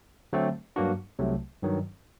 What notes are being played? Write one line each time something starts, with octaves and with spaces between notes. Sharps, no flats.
D3 F#3 A3 C4
G2 F#3 A#3 D4 F#4
C2 C3 F#3 A3
G2 D#3 F#3